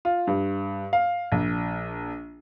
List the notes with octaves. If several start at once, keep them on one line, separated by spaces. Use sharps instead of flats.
F4
G2
F5
A#1